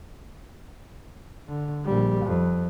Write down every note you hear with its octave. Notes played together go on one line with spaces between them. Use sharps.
D3
A#1 G3
F2